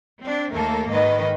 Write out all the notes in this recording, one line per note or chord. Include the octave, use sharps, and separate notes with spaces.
C4 D4
D#2 A3 A#3 A4 A#4
G#2 D#3 B4 D#5